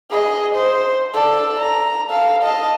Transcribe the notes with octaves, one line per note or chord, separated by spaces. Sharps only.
G#4 D#5
C5
A4 D5
A#5
A4 F5
D#5 A5